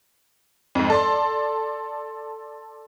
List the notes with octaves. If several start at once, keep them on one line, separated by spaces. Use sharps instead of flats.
F2 G#2
A4 D5 C6